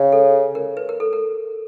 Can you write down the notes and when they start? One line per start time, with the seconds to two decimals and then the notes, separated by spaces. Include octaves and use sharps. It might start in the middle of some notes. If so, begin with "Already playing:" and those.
Already playing: C#3
0.13 A4
0.55 A#4
0.77 B4
0.89 A#4
1.00 A4
1.13 A#4